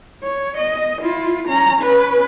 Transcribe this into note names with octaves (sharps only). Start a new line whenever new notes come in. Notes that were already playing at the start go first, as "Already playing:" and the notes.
C#5
D#5
E4 F4
C#4 A#5
C#4 B4